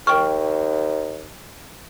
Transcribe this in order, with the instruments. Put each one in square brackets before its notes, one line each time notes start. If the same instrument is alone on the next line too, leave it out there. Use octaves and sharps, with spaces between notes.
[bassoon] D#2 [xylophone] A#4 G5 F6 [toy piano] C#6